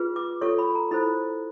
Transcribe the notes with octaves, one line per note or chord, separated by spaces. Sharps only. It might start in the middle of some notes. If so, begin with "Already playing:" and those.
Already playing: F4 G#4 B4
D6
F4 A4 C#5 C#6
B5
A#5
E4 A4 C5 B5